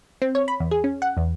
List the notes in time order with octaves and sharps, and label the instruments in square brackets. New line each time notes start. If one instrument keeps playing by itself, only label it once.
[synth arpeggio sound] C4
C#5
B5
E2
G#4
C#4
F#5
E2